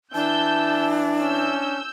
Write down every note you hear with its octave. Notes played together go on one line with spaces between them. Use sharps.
E3 D4 A5 E6 G6
C#4 E6 G6